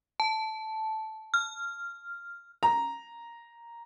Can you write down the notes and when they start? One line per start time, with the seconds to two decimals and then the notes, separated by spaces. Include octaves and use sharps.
0.20 A5
1.34 F6
2.63 A#5